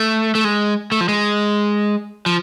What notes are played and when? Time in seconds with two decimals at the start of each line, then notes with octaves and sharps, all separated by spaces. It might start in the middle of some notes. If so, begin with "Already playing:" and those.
Already playing: A3
0.35 A3
0.45 G#3
0.92 A3
1.01 F3
1.09 G#3
2.26 F3